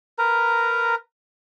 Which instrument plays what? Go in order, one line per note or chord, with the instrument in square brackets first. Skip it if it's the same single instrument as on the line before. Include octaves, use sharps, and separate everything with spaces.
[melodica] A#4 B4 A#5